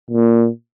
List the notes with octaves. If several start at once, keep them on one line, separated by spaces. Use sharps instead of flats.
A#2